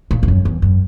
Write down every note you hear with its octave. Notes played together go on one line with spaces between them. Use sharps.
A#2
E2
F#2
E2
F#2